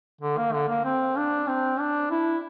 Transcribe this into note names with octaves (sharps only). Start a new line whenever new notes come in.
D3
A#3
D3
A#3
C4
D4
C4
D4
E4